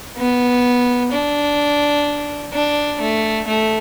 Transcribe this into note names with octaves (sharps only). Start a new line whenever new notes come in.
B3
D4
D4
A3
A3